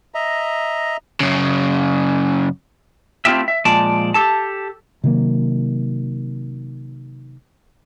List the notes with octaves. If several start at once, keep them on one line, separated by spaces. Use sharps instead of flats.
D#5 E5 A#5
F#2 C#3
A3 C4 E4 F4 G4 E5
E5
A#2 F3 G#3 D5 A5
G4 A4 A5
C3 D#3 F#3 A#3